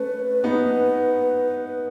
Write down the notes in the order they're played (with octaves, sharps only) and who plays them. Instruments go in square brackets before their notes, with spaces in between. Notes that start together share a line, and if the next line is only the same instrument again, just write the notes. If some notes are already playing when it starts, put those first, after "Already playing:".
Already playing: [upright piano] A3 C#4 [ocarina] B4
[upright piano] B3 D#4